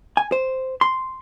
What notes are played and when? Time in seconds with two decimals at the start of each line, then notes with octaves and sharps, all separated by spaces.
0.17 G#5
0.32 C5
0.81 C6